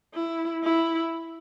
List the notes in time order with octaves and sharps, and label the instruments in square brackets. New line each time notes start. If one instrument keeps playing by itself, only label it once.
[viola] E4
E4